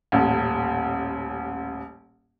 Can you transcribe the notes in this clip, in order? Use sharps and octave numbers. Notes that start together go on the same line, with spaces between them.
D#1 A1